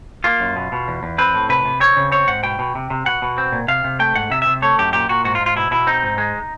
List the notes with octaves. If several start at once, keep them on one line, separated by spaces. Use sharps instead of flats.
A#3 F4
F#2
B2
B2
E2
E2
C4 B4
A2
C3 B4
C3
C4 C#5
C#3
C4 C#5
G#2 F#5
B2 G5
B2
C3
C3
B2 F#5
B2
C4
A#2
C3 F5
C3
A3 G5
G#2 F#5
C3 E5
C3 E5
A3 C#5
F#2 G4
A#2 G4
A#2 F#4
G#2 F#4
F4
G#2
F4
B2 E4
B2 E4
C4 D#4
G#2
G#3